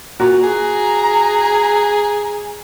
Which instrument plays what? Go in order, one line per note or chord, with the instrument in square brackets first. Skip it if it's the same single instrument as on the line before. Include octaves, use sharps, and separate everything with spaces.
[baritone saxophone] A#2 [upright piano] F#4 [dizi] A#5
[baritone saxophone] G#4